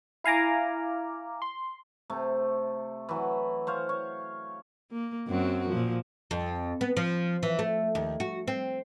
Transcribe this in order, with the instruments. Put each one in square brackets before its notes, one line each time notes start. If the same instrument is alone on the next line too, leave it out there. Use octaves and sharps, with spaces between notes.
[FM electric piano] E4 F5 G#5 A#5 D6
C6
[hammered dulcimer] C3 A3
E3 F#3
C5 C#5 F5
C#5
[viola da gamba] A#3
F#2 C4 F#4
A#2 F3
[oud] F2
B3
F3
E3
A3
D#2
F#4
C4